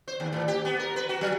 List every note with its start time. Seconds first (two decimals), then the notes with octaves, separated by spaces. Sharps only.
0.08 C5
0.20 D#2
0.32 A2
0.48 G4
0.65 B3
0.79 A#4
0.96 B4
1.09 F#4
1.21 F#3